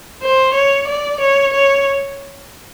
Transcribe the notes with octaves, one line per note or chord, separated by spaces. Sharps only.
C5
C#5
D5
C#5
C#5